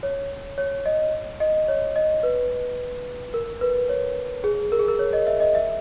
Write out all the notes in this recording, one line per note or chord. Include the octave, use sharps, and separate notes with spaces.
C#5
C#5
D#5
D#5
C#5
D#5
B4
A#4
B4
C#5
G#4
A#4
G#4
A#4
C#5
D#5
E5
D#5
E5